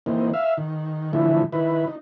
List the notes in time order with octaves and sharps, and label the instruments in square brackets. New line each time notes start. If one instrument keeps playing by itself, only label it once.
[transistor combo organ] E3 A#3 C4 D#4
E5 F5
D#3
D3 E3 F3 A3 E4
D#3 E4 B4
D#4